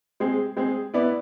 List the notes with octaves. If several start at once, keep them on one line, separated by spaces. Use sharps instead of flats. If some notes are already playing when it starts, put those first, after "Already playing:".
G#3 C4 G#4
G#3 C4 G#4
B3 E4 B4 D5